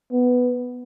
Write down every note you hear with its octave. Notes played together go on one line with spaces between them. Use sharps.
B3